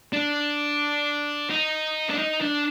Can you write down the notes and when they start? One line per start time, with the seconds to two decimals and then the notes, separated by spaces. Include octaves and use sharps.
0.13 D4
1.50 D#4
2.09 D4
2.18 D#4
2.41 D4